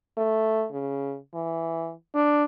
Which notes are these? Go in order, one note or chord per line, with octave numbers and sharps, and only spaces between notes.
A3
C#3
E3
D4